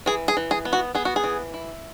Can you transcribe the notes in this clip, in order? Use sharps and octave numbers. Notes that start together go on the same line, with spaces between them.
E3 G#4
G#4
E3
G#4
B3
F#4
B3 G#4
F#4
G#4
E3
E4